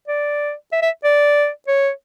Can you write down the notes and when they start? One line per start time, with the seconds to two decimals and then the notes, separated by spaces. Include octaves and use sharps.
0.08 D5
0.72 E5
0.82 E5
1.04 D5
1.68 C#5